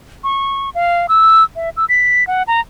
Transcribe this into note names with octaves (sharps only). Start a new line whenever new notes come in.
C#6
F5
E6
E5
E6
B6
F#5
A#5